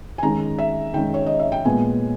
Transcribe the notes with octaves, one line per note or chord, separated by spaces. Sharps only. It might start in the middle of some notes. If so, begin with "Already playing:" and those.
G#5
D#3 G#3 C#4 A#5
E5
D#3 G#3 C#4 G5
C#5
D#5
E5
G5
A#2 G#3 B3 G#5